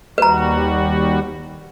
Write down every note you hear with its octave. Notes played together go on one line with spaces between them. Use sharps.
D#2 G3 F#4 B4 A#5